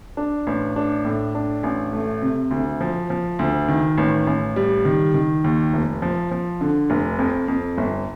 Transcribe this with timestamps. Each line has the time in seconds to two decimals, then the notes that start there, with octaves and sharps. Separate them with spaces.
0.17 D4
0.47 A1
0.76 D4
1.05 A2
1.35 D4
1.63 A1
1.93 A3
2.22 C3
2.51 D2
2.81 F3
3.10 F3
3.39 D2
3.68 D#3
3.98 A1
4.27 A1
4.56 G3
4.85 D#3
5.14 D#3
5.44 D#2
5.73 F1
6.02 F3
6.31 F3
6.61 D3
6.90 F1
7.19 F2
7.48 F2
7.78 G1